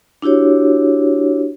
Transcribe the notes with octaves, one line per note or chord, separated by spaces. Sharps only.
D4 E4 F#4 G4 C#5